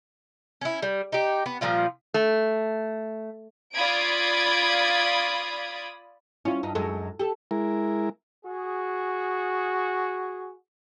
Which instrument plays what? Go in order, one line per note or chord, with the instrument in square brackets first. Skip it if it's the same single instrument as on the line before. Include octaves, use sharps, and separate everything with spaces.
[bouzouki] C#4 E4
G3
D#4 G4
B3
A#2 F3 G3 F4
[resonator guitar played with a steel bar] A3
[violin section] F4 D5 B5 D#6 G#6 D7
[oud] C#4 [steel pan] E4 F4
[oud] G2 D#4
[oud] F#2 G#3 [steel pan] A4
[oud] G4 A4
[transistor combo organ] G#3 E4 A#4
[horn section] F#4 G#4